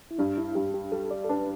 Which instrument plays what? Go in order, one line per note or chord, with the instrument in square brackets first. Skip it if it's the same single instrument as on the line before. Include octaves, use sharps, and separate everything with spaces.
[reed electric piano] E4
[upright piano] G2 [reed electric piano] D4
[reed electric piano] E4
[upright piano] G2 [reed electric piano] G4
[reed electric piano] G4
[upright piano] G3 [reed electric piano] A4
[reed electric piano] D5
A4
[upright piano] D4 [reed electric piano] B4